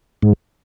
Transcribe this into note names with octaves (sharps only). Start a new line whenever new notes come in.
G#2